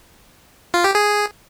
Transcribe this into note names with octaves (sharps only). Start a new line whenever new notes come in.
F4
G4
G#4